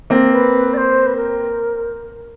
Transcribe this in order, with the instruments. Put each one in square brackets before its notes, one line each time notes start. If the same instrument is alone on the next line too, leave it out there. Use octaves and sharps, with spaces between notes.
[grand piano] A#3 C4
[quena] B4
D5
C5
B4
A#4